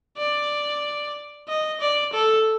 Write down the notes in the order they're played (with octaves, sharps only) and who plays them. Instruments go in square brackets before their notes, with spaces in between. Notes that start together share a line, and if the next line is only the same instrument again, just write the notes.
[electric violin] D5
D#5
D5
A4